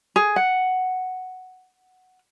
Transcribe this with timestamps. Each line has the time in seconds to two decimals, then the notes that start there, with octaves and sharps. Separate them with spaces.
0.16 G#4
0.36 F#5